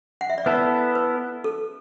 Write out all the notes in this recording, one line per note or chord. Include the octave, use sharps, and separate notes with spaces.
F#5
E5
D5
B3 E4 A4 B4
B4
A4